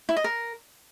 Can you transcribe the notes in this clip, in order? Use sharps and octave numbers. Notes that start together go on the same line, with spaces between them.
E4
D#5
A#4